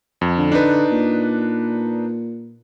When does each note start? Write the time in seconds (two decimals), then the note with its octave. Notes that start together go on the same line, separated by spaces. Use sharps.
0.21 F2
0.37 D3
0.52 D4 D#4 B4
0.92 A#2